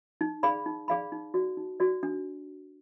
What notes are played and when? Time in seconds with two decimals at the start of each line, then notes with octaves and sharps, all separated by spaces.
0.21 D#4
0.43 G#4 D5 F5 B5
0.66 D#4
0.88 G#4 D5 F5 B5
1.12 D#4
1.34 F#4 D5
1.57 D#4
1.80 F#4 D5
2.03 D4